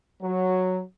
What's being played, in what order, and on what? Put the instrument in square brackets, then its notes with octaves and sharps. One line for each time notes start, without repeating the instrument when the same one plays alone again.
[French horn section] F#3